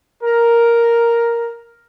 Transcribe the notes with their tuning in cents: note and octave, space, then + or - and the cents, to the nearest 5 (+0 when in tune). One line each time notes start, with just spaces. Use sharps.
A#4 +0